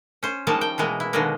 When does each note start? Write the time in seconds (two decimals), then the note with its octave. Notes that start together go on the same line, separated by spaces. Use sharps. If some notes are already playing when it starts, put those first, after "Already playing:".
0.23 C#4 C5
0.47 F3 G3 G#3 A#3 D#4 A5
0.61 G5
0.78 B2 E3 G#3 A#3
1.00 E4
1.13 B2 D3 D#3 F#3 G#3 A#3